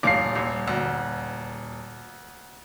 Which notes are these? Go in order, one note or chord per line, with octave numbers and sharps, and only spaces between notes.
D#1 A1 F5 D6 C7
C2
D2